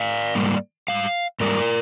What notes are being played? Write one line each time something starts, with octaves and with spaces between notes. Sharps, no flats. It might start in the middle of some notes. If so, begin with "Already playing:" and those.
Already playing: D5 F5
G#2 G3 A#3
G#2 G3 F5
G#2 G3 A#3 A#4 D5